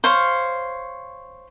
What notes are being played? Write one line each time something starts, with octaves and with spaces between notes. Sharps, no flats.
C5 C#5 F5